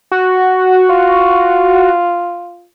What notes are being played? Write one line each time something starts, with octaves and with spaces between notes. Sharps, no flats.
F#4
F4